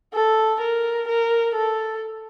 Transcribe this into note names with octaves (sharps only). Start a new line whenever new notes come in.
A4
A#4
A#4
A4